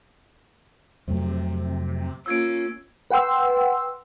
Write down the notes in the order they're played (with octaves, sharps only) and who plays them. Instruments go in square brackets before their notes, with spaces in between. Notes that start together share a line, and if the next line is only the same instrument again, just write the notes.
[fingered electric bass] F2 F#3 A3 [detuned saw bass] C3
[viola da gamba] A#3 C#4 F4 [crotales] E6 G#6 D7
[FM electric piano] B4 F#5 G5 C6 E6